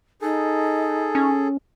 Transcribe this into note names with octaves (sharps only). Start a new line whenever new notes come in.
D#4 G#4 A4
C#4